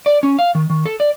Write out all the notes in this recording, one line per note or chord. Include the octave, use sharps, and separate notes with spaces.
D5
C#4
F5
D#3
D#3
A4
D5